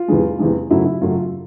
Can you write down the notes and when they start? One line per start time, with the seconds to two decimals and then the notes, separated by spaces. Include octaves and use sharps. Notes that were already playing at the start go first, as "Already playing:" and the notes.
Already playing: F4
0.08 E2 C3 E3 G#3
0.39 E2 C3 E3 G#3
0.70 F#2 C#3 F#3 A3 E4
0.85 E4
1.01 F#2 C#3 F#3 A3 F4